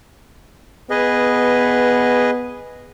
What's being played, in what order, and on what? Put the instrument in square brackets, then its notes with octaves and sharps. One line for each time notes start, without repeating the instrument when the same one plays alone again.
[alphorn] B3 [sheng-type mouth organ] G#4 B4 D#5